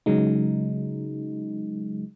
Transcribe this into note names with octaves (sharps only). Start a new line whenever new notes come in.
C#3 F#3 G#3 D#4